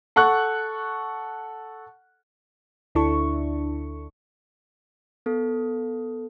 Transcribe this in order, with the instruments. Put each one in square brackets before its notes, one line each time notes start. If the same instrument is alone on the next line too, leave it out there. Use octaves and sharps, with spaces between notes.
[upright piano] A4 F#5 C#6 F#6
[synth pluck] D2 D4 E4 A4 C#6
[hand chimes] B3 A4